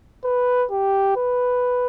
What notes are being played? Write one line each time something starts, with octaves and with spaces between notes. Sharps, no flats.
B4
G4
B4